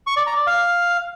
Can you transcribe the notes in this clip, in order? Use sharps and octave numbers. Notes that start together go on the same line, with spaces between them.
C#6
D5
A#5
D5
F5